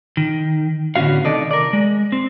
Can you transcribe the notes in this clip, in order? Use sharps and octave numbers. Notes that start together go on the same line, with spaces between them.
D#3
A2 D3 B3 C#4 F#4 F5
C3 D#3 A4 D5 D#5
A#4 D5
G#3
C4